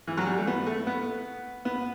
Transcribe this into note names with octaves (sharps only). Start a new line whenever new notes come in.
E3
F#3
G3
A3
B3
A3
B3
B3